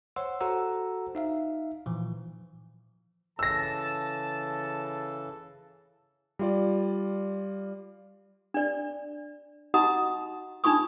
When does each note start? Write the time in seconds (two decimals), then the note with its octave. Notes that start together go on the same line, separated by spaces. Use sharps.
0.16 C5 C#5 F#5 C6 E6
0.41 F#4 A4 C5 F#5 A#5 E6
1.15 D#4 E5 F5
1.86 A#2 E3 F3
3.39 C#3 E3 A4 A5 E6 A#6
6.39 G3 F4 D5
8.54 D4 D5
9.74 D#4 F#4 D#5 F#5 A#5 D#6
10.64 D4 D#4 F4 C#6 D#6